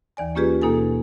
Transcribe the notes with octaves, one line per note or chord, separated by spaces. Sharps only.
D#2 E3 D5 G#5
A#3 C#4 F4 G4 G#4 B4
D#2 B2 A#3 D#4 A4 G#5